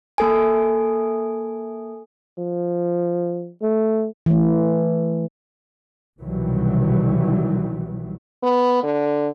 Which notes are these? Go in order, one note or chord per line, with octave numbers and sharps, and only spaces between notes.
A#3 A4 G#5
F3
A3
E3 A3
C2 B2 D#3 E3 F#3 G3
B3
D3